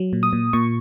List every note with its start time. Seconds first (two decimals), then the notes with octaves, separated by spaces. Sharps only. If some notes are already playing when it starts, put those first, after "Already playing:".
Already playing: F#3
0.13 A#2
0.23 D#6
0.33 A#2
0.53 A#2 C#6